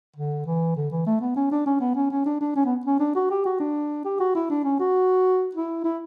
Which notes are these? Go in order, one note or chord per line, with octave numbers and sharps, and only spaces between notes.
D3
E3
D3
E3
A3
B3
C#4
D4
C#4
B3
C#4
C#4
D4
D4
C#4
B3
C#4
D4
F#4
G4
F#4
D4
G4
F#4
E4
D4
C#4
F#4
E4
E4